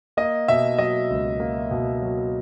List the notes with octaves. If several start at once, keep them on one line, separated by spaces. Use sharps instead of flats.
A#3 D#5
B2 E5
F#3 D#5
C#2
A#3
B2
F#3